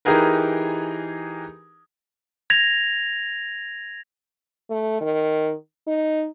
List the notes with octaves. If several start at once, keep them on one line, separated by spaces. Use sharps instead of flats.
E3 D#4 G4 G#4 A#4 B4
G#6 A#6 F7
A3
D#3
D#4